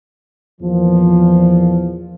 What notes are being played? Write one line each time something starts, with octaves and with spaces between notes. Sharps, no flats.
E2 A#2 F3